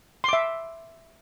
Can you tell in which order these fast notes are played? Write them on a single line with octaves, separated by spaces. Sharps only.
C6 D6 E5